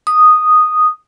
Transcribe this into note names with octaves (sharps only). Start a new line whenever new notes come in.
D#6